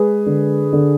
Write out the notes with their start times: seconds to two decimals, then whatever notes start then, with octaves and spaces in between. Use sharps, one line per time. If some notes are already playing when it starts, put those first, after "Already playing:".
Already playing: G#3 G#4 B4
0.26 D3
0.73 D3